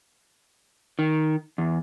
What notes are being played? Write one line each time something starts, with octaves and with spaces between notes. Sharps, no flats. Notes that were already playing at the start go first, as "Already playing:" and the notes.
D#3
E2